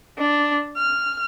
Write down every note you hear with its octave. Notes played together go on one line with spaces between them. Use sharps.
D4
F6